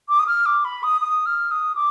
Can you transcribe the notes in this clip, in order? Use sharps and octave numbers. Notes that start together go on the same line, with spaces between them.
D6
D#6
F6
D6
B5
D#6
D#6
F6
D#6
D6